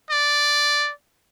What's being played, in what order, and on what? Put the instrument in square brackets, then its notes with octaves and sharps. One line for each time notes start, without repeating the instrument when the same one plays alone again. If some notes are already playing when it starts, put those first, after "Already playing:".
[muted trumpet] D5